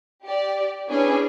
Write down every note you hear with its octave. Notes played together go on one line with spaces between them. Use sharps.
G4 D5
C#4 D4 E4 G#4 B4 C#5